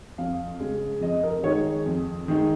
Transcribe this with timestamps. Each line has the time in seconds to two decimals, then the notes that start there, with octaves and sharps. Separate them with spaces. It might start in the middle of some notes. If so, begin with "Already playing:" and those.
0.18 F2 F5
0.60 C#3 G#3
1.01 F2 D#5
1.23 A#4
1.43 D#3 G#3 D#4 C#5
1.86 F2
2.28 D#3 G#3 D#4